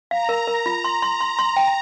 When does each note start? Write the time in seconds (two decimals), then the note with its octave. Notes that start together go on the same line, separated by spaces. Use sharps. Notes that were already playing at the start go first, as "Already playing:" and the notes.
0.10 F5 A#5
0.29 A#4
0.47 A#4
0.66 F4
0.84 C6
1.02 C6
1.21 C6
1.39 C6
1.56 G5